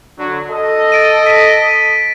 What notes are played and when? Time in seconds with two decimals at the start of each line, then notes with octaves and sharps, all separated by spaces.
0.18 D3 F#3
0.51 A4 D#5
0.92 A6 D7 D#7
1.26 B6 D#7